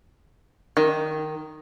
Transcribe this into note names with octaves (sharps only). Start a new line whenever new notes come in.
D#3